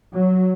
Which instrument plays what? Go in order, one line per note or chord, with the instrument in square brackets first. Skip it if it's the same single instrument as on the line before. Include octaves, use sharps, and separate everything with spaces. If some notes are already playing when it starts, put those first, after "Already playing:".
[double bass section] F#3